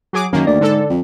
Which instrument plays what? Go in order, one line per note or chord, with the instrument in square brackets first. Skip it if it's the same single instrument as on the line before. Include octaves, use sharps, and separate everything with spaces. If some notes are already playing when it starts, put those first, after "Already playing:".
[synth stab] F#3 G#4 D6
[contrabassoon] F#2 [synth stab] D#3 A#3
[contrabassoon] D2 [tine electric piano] D5
[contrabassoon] G#2 [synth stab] D3 A4
[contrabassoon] F2